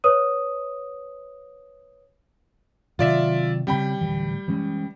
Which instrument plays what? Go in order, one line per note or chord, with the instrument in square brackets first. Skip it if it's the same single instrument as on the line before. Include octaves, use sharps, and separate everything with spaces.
[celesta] B4 C#5 D#6 D#7
[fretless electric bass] C3 D#3 F#3 [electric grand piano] F4 D5 E5
[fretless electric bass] C#3 C4 [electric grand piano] G3 G5 B5
[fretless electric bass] D1 D2 E3
E3 G#3 C#4